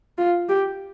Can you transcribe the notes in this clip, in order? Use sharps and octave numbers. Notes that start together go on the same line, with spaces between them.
F4
G4